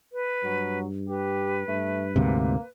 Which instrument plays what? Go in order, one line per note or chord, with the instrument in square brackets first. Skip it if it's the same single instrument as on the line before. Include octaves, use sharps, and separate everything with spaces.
[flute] B4
[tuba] G2 [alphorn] F#3
[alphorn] G4 [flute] B4
[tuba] G2 [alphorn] A3
[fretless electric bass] D2 G#2 C3 [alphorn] A#3